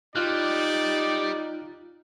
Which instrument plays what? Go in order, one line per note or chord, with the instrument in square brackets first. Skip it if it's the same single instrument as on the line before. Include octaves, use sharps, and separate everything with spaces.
[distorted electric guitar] G3 [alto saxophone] D#4 [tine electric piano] F4 F6 F#6 [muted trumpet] D5